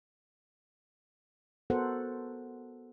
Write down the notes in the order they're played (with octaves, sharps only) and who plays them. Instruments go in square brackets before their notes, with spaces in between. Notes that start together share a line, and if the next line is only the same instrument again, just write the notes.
[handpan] B3 F#4 A4 A#4 C5 F#5